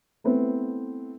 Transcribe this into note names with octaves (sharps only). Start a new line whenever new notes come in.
A3 B3 C4 E4